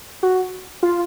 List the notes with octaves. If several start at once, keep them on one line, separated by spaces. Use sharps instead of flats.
F#4
F4